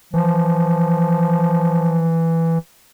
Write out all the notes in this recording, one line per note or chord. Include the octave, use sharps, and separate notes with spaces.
E3 F3